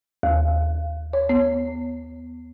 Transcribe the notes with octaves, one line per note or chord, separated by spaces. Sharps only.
D#2
C#5
B3